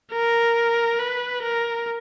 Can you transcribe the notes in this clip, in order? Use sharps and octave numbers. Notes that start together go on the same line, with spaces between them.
A#4
B4
A#4